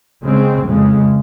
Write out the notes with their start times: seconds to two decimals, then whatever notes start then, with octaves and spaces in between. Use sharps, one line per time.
0.23 C#3 G#3 C4
0.66 F2 C#3 G#3